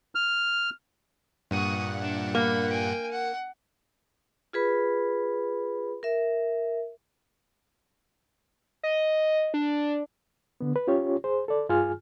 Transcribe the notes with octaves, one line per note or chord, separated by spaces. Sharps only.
F6
G2 A#2 F#5 C#6 D#6
D4 E5
A#3 B5
G5 G#5
F#5
F4 G#4 B4 B5
A#4 E5
D#5
D4
D3 B3
B4
C#4 F4 G4 C#5
G#4 C5
A4 D5
G2 F4 G#4 G#5 F6